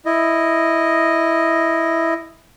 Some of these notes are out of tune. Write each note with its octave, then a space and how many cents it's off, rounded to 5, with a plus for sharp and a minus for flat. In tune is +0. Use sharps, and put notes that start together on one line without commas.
E4 +0 D#5 +0